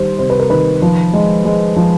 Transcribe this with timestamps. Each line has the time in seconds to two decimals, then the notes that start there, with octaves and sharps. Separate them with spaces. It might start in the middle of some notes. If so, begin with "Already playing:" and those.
Already playing: D#3 G3 C5
0.19 C3 C5
0.30 B4
0.39 A#4
0.50 D#3 B4
0.82 F3
1.13 G#3
1.45 G#3
1.76 F3